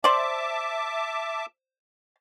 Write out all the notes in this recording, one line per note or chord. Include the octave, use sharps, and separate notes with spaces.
C5 D5 E5 A5 D6